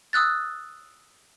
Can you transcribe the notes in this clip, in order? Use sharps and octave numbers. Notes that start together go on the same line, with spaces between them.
D#6 E6 F#6 A6